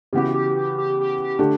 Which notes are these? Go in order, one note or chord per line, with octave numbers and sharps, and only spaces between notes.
C#3 E3 B3 F#4 G4
G4
G4
G4
G4
G4
D3 A3 D4 G4